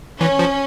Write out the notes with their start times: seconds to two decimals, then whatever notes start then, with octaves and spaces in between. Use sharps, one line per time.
0.20 E3 C#4
0.39 F3